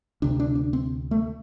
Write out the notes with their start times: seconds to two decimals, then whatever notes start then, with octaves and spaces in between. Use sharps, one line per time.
0.22 D2 C3 D4
0.40 D4
0.55 D4
0.73 C4
1.11 A3